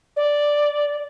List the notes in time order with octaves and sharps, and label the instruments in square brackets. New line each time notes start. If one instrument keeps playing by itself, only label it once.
[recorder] D5